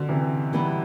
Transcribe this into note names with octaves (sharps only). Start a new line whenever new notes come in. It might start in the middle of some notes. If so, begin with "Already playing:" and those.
Already playing: B2 D3
C3 E3
E3 G3 B3 E4